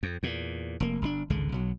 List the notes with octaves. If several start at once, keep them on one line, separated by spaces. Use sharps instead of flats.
F2
E2 A#2
F1 A#3
G1 B2 D4
G#1 C#2 D3 G#3
B1 F#3